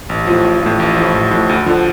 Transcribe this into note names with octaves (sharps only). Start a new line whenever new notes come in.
A1
A2 F3
A1
A2 F3
A1
F3
A2
A1
A2 F3
D2
D3 F3